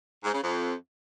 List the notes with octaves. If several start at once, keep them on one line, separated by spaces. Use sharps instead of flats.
G#2
C#3
F2